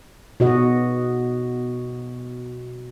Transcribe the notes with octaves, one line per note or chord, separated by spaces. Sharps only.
B2 F#4 D#5